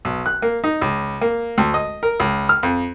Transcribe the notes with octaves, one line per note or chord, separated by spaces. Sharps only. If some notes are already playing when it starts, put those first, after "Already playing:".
B1
F#6
A#3
D#4
C#2
A#3
D2
D#5
A#4
C#2
F6
F2